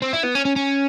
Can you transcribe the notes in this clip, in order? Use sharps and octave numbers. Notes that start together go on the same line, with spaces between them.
C4
E4
B3
C#4
C#4
C#4